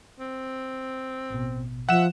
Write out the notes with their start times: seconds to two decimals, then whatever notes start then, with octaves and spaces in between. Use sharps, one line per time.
0.20 C4
1.30 A1 B2
1.89 F3 E5 F#5 E7